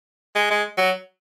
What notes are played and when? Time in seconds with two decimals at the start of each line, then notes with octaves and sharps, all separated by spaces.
0.35 G#3
0.50 G#3
0.78 F#3